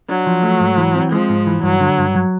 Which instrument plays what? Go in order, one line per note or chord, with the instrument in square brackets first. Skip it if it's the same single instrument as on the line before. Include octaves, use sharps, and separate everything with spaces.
[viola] F#3 [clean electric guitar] D4
[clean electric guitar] F3
A3
G#2
E3
C4
[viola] F3 [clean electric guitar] G#3
[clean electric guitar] G#2
E3
[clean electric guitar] G2 [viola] F#3
[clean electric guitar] D3
G2
F#3